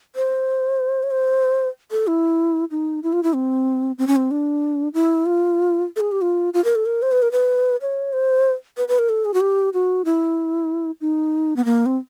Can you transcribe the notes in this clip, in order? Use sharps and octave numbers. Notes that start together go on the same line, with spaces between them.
C5
C#5
C5
A4
E4
D#4
E4
F4
E4
C4
C4
C#4
C4
D4
E4
F4
A4
G#4
G4
F4
F4
A#4
A4
A#4
C5
B4
A#4
B4
C#5
C5
B4
B4
A#4
A4
G#4
F#4
G4
F#4
E4
D#4
B3
A#3
C4